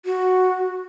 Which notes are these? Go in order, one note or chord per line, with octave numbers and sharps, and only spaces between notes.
F#4